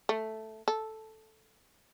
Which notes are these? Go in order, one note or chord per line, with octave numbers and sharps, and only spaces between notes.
A3
A4